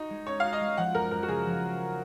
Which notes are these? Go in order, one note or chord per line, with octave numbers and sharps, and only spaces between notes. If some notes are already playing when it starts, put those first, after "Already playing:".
Already playing: D#4 F#4
G#3
C#4 C#5
F#4 F5
D#5
G#3
F3 F#5
F#2 A#4
F#2 A#4
F#4
C#3 G#4
F3